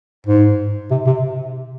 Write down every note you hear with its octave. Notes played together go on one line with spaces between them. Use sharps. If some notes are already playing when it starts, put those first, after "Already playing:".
G#2
C3
C3